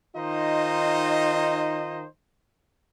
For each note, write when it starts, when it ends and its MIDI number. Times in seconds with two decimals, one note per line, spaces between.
0.16 2.06 51
0.16 2.06 63
0.16 2.06 65
0.16 2.06 72
0.16 2.06 75